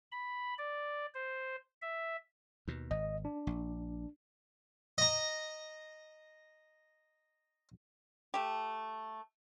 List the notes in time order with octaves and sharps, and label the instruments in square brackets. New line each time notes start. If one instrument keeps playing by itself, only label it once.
[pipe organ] B5
D5
C5
E5
[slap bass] D#2 B2
[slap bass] G#1 [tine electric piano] D#5
[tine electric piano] D4
[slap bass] A#1
[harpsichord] D#5 A#5
[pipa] A3 G4